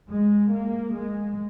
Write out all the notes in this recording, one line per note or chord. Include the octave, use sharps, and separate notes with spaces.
G#3
A#3
G#3